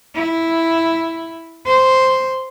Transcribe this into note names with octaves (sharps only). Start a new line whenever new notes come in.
E4
C5